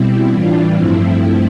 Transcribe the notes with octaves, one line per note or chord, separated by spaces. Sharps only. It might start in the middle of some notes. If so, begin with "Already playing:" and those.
Already playing: B2 G3 C4 E4
A2 E3 G3 D4 F4
G2 F3 A3 C4 E4